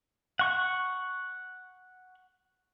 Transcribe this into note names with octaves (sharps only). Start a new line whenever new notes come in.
F#5 C#6